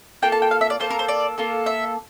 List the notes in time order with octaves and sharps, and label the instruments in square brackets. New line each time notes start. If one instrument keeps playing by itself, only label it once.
[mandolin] A#3 F4 A4 G5
A5
G5
F5
E5
D5
A#3 F4 A4 C5
A#4
C5
D5
A#3 F4 A4
E5